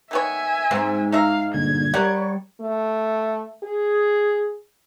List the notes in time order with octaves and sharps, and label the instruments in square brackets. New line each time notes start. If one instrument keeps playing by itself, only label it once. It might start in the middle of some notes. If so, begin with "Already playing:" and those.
[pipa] D#3 B3 C#5 [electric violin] E5 G#5
[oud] G#2 [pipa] C4 C#4
[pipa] D#4 E5 A#5 [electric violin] F5
[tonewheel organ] G2 A#2 D3 [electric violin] G#6
[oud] G3 [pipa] A#4 F#5 [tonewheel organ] C#5
[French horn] A3
G#4